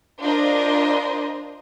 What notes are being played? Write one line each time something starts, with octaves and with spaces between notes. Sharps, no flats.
D4 F4 A#4 C5 D#5